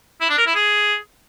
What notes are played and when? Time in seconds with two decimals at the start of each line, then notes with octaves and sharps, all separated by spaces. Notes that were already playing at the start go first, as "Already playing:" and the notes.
0.21 E4
0.29 D4
0.38 A#4
0.46 E4
0.55 G#4